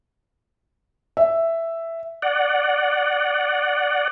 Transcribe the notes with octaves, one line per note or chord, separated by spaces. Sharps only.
E5
D5 F#5